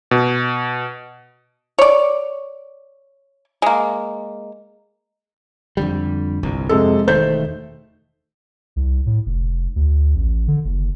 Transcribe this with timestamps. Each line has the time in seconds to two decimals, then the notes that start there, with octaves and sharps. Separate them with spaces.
0.11 B2
1.79 C#5 D5
3.62 G#3 A#3
5.77 F2 D3 G3
6.43 G1 C2
6.69 F2 C3 G#3 A4
7.08 E1 D#3 A3 C5 G6
8.76 C2
9.06 A2
9.26 F1
9.76 D2
10.15 A1
10.48 D3
10.65 F#1